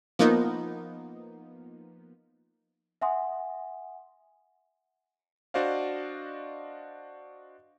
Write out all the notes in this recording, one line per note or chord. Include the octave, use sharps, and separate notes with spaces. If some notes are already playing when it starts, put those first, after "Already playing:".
F3 A#3 B3 D#4
E5 F#5 G#5 C6 D#6
D4 F#4 C5 D5 D#5 F5